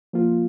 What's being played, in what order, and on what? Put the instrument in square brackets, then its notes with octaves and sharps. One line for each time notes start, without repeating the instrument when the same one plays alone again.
[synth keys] F3 A#3 F4